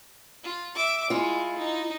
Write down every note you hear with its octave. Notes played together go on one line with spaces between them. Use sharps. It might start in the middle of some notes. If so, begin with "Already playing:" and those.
F4
E5 D6
G#3 E4 F4
D#4